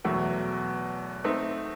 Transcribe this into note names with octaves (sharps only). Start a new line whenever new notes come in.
E2 B2 F#3 A3
A3 C4 D#4